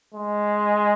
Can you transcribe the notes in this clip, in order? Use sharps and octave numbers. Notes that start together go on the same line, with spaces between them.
G#3